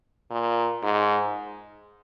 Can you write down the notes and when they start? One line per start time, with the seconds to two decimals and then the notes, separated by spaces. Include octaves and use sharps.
0.31 A#2
0.83 G#2